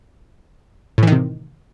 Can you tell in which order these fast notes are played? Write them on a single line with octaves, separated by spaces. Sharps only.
A2 E3 D#3 C3